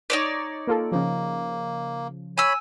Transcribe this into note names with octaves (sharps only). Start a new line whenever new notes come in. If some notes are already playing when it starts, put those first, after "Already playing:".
D#4 C#5 D5
A#3 F4 A4
C#3 F3 A#3
C#5 G#5 B5 E6